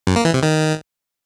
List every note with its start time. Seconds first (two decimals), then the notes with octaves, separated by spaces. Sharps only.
0.07 F#2
0.16 A#3
0.25 E3
0.34 C3
0.43 D#3